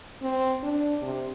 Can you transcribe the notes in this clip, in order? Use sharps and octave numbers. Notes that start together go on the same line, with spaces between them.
C4
D4
C3